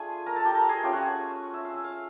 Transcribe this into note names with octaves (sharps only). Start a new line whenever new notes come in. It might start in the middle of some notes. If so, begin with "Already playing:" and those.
Already playing: A3 D4 F4 G#4 G#5
A#4 A#5
A4 A5
G4 G5
A#4 A#5
G#4 G#5
A3 C#4 F4 G4 G5
F#4 F#5
G#4 G#5
E5
F5
E5
F5